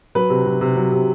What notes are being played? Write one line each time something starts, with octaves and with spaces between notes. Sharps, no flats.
F#3 B4
C3
F#3
C3
F#3
C3